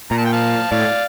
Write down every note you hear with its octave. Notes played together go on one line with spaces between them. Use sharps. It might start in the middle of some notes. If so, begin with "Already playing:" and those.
A#2 A#5
A5
G5
F5 A5
A2 D5 F5